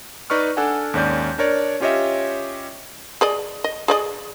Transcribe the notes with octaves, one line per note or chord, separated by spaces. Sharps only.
D#4 B4 D5 C#6 F6
D4 A4 D5 F#5 G#5 A5
D#2 G#2 C#4 D5 G6
D4 A#4 C#5 D5
C#4 F4 G4 C#5 D#5 E5
G#4 D5 D#5
D#5
G#4 D5 D#5